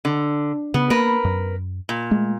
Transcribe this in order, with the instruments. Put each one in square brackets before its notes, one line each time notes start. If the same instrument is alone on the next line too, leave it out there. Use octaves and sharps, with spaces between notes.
[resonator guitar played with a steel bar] D3
[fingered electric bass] C#3 [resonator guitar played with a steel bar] B3
[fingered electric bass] A#3 [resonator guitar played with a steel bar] A#4 B4
[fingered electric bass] F#2
[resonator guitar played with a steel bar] A#2
[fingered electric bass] G#3 A3